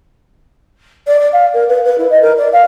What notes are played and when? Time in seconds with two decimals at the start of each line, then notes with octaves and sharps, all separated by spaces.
1.07 D5
1.19 D5
1.32 F5
1.53 A#4
1.68 B4
1.83 B4
1.97 E4
2.10 D#5
2.21 A#4
2.37 D5
2.52 F5